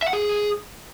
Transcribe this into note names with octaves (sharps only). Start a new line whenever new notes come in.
E5
F#5
G#4